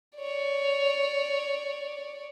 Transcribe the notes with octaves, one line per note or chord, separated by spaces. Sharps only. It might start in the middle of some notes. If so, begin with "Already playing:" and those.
C#5 D5